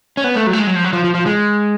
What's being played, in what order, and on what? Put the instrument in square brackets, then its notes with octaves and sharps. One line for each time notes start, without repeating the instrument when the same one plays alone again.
[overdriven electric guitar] C#4
B3
A3
F#3
A3
G#3
F#3
F3
F#3
F3
F3
F3
G#3